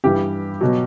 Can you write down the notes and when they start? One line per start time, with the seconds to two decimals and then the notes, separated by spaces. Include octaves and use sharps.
0.04 G2 E3 G3 G4
0.61 B2 F#3